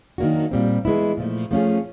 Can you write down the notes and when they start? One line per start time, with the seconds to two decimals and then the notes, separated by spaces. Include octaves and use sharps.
0.18 D#3 F#3 A#3 D4 F#4
0.51 A#2 G3 C4
0.85 E3 G#3 B3 E4
1.17 A#2 F3 A3
1.51 F3 A3 C#4 F4 G#4